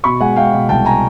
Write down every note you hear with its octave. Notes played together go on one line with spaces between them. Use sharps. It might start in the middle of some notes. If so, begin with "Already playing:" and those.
B2 B5 C#6
G#3 F#5 G#5
G#3 F5 G5
B2
C2 G5 A5
G#5 A#5